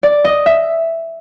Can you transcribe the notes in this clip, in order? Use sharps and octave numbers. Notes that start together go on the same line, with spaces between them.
D5
D#5
E5